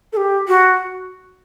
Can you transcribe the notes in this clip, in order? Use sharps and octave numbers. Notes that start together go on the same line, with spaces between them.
A4
G4
F#4